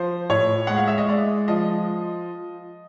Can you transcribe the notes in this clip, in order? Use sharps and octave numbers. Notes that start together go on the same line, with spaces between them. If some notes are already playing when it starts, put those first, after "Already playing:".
Already playing: F3 C5
A2 C#5
G#3 F#5
F5
E5
D#5
G#3 D5
F3 D#5